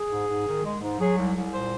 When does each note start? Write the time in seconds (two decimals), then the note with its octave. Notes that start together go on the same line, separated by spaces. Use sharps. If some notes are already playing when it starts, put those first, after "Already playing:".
Already playing: G#4
0.11 G#2
0.28 G#2
0.46 D#3
0.64 G#3
0.81 G#2
0.99 F#3 G#4
1.17 C2
1.34 C2
1.52 A#2 C5